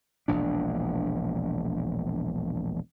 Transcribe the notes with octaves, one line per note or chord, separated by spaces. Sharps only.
E1 A#1 D4